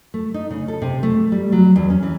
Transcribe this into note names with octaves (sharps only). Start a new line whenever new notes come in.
A3
D#4
C#3
A4
C3
A3
G3
F#3
E2
C#4
E3